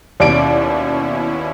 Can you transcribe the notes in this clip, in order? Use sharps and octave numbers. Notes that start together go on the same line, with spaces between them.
D#2 B2 C#4 E4 D5 D7